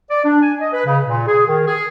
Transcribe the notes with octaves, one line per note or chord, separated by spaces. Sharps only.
D5
D4
G#5
D#5
B4
C#3
A#2
G#4
D#3
G#4